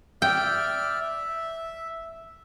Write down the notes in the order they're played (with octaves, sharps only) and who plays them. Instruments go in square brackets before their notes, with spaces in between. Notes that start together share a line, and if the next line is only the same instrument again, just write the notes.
[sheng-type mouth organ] D5 E5 F6 [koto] G5
[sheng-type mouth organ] E5